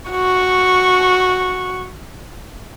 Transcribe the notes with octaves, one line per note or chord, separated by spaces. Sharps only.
F#4 C#6